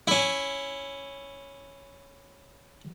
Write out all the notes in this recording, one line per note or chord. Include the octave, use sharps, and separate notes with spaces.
C#4 E4